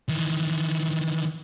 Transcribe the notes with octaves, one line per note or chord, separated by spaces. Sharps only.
D#3 E3